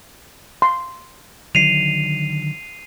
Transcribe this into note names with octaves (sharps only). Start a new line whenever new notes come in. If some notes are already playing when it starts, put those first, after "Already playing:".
C6
D3 D#3 F#3 C7 D#7 F7